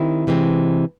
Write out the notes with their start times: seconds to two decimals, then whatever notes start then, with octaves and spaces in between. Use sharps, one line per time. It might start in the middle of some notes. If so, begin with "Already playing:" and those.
Already playing: D#3 G3 C4 E4
0.27 C3 E3 G#3 C4